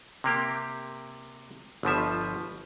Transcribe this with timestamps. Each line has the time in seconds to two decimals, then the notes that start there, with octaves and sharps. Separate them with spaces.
0.24 C3 A#3 G4
1.83 G1 B2 F3 E5